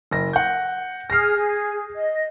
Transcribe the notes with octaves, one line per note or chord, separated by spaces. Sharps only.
F#1 A#6
F#5 G6
G#4 F6 A#6 C7
G#4
D#5